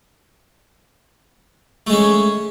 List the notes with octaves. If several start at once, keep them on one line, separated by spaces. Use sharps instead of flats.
G#3 A3 C#4